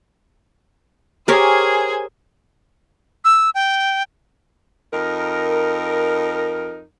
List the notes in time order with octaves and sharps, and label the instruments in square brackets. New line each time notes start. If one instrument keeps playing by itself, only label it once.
[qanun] G4 A#4 C#5 [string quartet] G#4 C5 G#5
[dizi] E6
G5
[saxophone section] F2 D#4 A#4